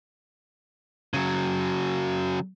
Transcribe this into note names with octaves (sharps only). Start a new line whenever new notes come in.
C#3 F#3